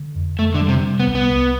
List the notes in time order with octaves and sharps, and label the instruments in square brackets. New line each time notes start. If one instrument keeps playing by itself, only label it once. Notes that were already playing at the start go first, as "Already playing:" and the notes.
Already playing: [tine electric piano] D3
F2
[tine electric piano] F2 [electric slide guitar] A3
[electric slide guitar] D3
[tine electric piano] G3
[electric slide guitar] C3
[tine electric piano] C3
[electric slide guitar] B3
[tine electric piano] C2
[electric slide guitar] B3
[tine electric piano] C2